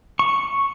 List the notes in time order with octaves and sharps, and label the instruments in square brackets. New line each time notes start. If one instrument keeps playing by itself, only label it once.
[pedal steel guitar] C#6